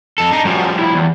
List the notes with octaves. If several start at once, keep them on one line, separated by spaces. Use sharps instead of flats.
F2 A4
D4 D#4
F#2 F3 G3
E4 B5
E2